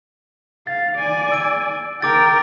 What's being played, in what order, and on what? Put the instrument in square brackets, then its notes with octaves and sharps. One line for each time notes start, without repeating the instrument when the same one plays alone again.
[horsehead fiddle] F5 [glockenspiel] A6
[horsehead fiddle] D5 G#5
[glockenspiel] E6 D7
[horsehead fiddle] A#4 G5 [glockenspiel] D6 A6